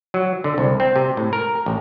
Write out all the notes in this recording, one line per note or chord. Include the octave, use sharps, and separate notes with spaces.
F#3
D3
C2
C4
C3
A2
A#4
A1